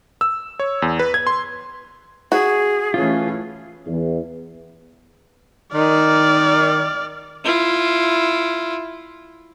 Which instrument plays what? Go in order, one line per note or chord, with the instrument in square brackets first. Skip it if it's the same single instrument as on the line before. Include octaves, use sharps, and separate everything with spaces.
[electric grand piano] E6
C#5
E2
B4
G#6
C6
[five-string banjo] F#4 [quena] G#4
[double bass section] E3 A3 C#4 [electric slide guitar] F4
[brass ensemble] E2
[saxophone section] D#3 [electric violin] D5 F6
[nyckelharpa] E4 F4